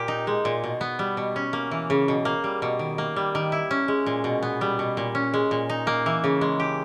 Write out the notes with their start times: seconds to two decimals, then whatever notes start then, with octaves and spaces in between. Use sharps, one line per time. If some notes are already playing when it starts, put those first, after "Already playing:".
Already playing: A#2 A#3 G4
0.08 D#4
0.27 G#3
0.45 A#2
0.64 B2
0.81 B3
0.99 G3
1.17 B2
1.36 C#4
1.53 A#3
1.71 E3
1.90 C#3
2.08 B2
2.25 A#3
2.44 G3
2.62 B2
2.79 D#3
2.98 A#3
3.16 G3
3.35 D#3
3.52 E4
3.71 C#4
3.88 G#3
4.06 A#2
4.24 B2
4.43 B3
4.61 G3
4.79 B2
4.97 A#2
5.15 C#4
5.34 G#3
5.51 A#2
5.70 D#4
5.87 A#3
6.06 E3
6.24 C#3
6.41 G#3
6.60 G4